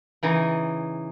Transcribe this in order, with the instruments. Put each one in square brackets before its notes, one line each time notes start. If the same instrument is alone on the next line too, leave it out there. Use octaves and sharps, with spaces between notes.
[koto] C#3 E3 D#4